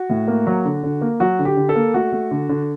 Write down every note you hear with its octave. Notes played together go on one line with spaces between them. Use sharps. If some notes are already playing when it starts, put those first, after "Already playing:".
Already playing: F#4
A2
A#3
F#3
D3
D3
A#3
F#3 F#4
D3
G4
D3
A4
A#3
A3 F#4
A3
D3
D3